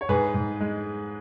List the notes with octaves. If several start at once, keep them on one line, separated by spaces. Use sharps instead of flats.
C#5
G#2 G#4 B4
G#2
G#3